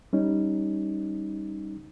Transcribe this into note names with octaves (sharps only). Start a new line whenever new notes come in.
G3 C#4 D#4